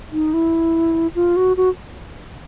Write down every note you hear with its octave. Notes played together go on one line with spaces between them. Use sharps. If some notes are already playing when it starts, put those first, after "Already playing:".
D#4
E4
F4
F#4
F#4